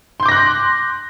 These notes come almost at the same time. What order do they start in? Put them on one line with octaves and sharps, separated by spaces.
C6 G6 D6 A#6 F#6